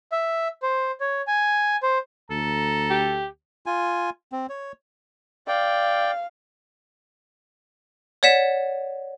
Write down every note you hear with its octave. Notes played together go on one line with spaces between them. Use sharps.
E5
C5
C#5
G#5
C5
D2 A4 A#5
G4
F4 G#5
C4
C#5
D5 F5 G5
C#5 D5 F#5 B6 E7